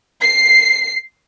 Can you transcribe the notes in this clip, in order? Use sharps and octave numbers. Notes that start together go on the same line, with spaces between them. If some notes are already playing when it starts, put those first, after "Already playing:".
C7